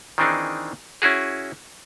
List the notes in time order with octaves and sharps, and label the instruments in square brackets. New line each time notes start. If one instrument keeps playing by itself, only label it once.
[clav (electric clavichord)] D#3 E3 C4 D4 D#4 G#4
C#4 E4 F#4 G#4